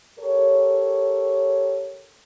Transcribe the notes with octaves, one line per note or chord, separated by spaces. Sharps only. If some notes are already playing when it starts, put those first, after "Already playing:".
G4 A4 A#4 C#5